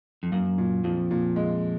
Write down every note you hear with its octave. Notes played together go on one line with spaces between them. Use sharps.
F2
F#2 A#3
A#2
F2 F3
A#2
G#3